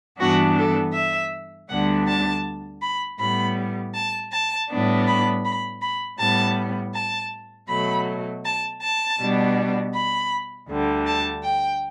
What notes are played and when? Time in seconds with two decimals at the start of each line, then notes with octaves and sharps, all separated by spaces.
0.19 G2 E3 B3 D4 F#4
0.58 A4
0.94 E5
1.69 D2 D3 G3 B3 D4 F#5
2.08 A5
2.82 B5
3.20 A2 G3 B3 B5
3.94 A5
4.33 A5
4.70 A2 G3 B3 D4
5.07 B5
5.45 B5
5.82 B5
6.19 A2 G3 B3 A5
6.94 A5
7.70 B2 F#3 A3 B5
8.45 A5
8.82 A5
9.19 B2 G3 B3 D4
9.95 B5
10.69 D2 D3 G3
11.07 A5
11.44 G5